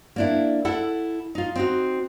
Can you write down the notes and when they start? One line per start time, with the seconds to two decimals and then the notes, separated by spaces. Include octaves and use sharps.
0.16 A#3 D4 E4
0.65 E4 A4 F#5
1.35 D#4 F4
1.55 C4 D#4 F#4